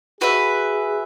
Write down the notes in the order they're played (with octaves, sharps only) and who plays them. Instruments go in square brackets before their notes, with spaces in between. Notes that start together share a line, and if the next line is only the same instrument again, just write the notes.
[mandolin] F#4 B4 E5 [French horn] G#4